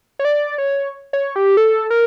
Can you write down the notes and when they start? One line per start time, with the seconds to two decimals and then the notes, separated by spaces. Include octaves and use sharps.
0.19 C#5
0.25 D5
0.58 C#5
1.13 C#5
1.36 G4
1.57 A4
1.90 A#4